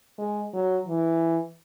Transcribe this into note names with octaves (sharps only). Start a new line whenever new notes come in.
G#3
F#3
E3